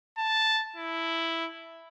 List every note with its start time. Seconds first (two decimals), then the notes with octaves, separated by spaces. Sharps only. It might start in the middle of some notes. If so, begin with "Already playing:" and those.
0.18 A5
0.76 E4